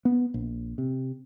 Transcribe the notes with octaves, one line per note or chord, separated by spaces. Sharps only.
B3
A#1
C3